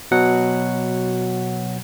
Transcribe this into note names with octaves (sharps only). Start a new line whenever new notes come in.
B2 F#3 F#5